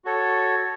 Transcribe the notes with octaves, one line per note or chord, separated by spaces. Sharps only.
F#4 A4 C#5